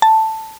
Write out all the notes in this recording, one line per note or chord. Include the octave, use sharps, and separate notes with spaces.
A5